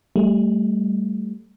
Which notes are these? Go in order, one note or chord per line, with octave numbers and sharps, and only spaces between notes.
G3 A3